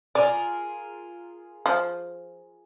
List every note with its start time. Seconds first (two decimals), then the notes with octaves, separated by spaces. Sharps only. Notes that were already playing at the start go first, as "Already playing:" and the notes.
0.15 F4 G#4 A#4 D5
1.66 F3